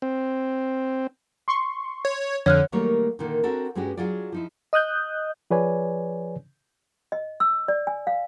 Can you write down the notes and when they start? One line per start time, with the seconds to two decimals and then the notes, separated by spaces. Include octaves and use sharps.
0.02 C4
1.48 C6 C#6
2.05 C#5
2.46 F2 D3 C#5 F6 F#6
2.72 D#3 F#3 G3 A3 A#3 C#5
3.19 A#2 D3 D#3 A#3
3.43 C4 D4 F#4 A4 A#4
3.75 G2 G#3 B3 C#4 F#4 G4
3.97 F#3 D4 F4 G#4 D5
4.32 F3 D#4 E4
4.73 D#5 D#6 F#6 G6
5.51 F3 G#4 B4 C#5 D5 G#5
7.12 D#5
7.40 E6
7.68 D5
7.87 G#5
8.07 F5